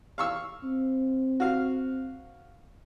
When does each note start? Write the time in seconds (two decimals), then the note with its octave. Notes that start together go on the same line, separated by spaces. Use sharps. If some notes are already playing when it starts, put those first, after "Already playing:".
0.18 F5 C#6 E6
0.63 C4
1.40 F#4 F5